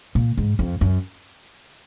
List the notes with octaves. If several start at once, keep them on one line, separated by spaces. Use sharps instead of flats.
A#2
G#2
F2
F#2